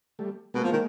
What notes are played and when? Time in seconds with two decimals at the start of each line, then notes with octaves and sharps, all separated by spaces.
0.19 G3 A3
0.54 B2 G#3 A#3
0.64 F3
0.73 D#3